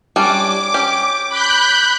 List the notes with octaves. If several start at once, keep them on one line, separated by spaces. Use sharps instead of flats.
G3 C#4 D4 D6
C#4 G4
B5 F#6 G6